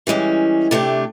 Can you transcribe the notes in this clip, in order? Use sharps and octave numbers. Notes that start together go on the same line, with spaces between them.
E3 G3 G#3 C#4
C3 A3 D4 G4